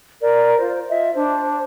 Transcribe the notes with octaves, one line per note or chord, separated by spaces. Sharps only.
A#4 D5
F4 C5
F4 D#5 E5
D4 C5